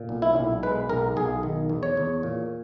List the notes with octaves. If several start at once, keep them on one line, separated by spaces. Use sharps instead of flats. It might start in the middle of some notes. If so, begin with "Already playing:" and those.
Already playing: A#2
B1
E4
B1
G#3 B4
B1 A#4
B1 G#4
D#3
E2
C#5
E2
A#2